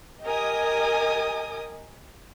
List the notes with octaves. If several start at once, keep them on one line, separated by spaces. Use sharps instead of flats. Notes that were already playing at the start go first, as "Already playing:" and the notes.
G4 A#4 D#5 G#5 D#6